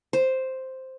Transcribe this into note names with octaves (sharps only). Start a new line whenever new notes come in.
C5